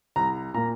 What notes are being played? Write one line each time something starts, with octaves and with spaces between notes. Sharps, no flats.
C2 A#5
A#2 A#3 A#5